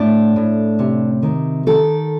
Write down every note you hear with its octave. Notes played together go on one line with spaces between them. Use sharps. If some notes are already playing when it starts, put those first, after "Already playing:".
Already playing: A2 D4
A2
C3
D#3
D#3 A4